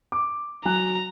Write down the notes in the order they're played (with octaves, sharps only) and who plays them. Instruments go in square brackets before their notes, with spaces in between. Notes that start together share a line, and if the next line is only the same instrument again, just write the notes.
[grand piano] D6
[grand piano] F#3 G#5 F#6 [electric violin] A#5